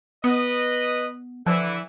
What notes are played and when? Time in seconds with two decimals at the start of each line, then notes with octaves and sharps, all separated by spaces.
0.24 B3 B4 D#5
1.46 D3 E3 F3 E4